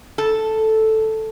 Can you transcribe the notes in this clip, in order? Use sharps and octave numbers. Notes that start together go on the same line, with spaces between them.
A4